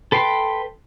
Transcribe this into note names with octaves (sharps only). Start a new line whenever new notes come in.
A4 B4 G5 C6